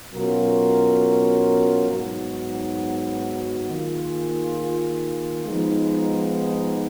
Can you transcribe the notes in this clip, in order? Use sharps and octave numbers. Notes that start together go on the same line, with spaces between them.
B2 F#3 C#4 F4 A#4
G#2 F#3 B3 D#4 F#4
D#3 A#3 F4 G#4
F3 G#3 B3 D#4